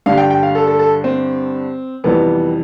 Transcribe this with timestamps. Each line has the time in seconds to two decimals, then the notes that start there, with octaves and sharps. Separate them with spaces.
0.06 G2 D3 G3 F5
0.18 G5
0.30 G5
0.43 F5
0.55 A4
0.67 A4
0.79 A4
1.04 C4
2.04 F2 C3 E3 G3 B3